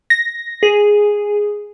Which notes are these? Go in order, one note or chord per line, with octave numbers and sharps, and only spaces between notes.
A#6
G#4